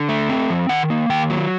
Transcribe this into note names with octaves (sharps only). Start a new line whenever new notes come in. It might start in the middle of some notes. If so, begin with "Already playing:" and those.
Already playing: D3
A3
C4
F3
D#3 F#5
A#3
D#3 G5
F#3